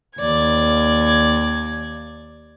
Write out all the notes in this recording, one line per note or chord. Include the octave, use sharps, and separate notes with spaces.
D#2 D5 G#6